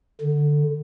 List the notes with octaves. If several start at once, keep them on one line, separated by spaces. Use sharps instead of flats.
D3